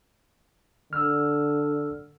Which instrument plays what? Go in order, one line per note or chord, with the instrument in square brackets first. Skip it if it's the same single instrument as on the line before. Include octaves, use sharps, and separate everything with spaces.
[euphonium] D3 [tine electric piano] E6 F6